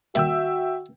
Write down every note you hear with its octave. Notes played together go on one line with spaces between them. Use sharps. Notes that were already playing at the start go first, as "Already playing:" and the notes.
D#2 G3 F#4 E5 G5 E6